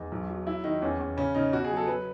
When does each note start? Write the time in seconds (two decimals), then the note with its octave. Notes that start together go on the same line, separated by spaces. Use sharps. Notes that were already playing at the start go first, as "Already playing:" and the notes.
Already playing: E2 D#4
0.12 B1
0.30 F#3
0.47 F#3 E4
0.64 D#3 D#4
0.82 E2 C#4
0.99 E2
1.17 C#3 C#4
1.35 C#3 D#4
1.53 B2 F#4
1.64 G#4
1.71 F#3
1.76 A4
1.87 F#3 B4